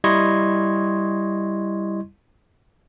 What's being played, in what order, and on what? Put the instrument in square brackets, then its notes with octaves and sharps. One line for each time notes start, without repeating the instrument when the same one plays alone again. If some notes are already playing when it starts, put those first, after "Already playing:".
[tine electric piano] G3 E4 D#5 C6 C#6 G#6